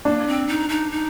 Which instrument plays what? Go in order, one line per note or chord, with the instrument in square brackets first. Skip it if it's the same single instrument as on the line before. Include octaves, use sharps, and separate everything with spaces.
[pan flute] A#3 [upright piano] D4
[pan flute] C4
D#4
D#4
D#4